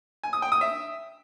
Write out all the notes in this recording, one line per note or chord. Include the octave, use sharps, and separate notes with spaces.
G#5
D#6
G5
D#6
E5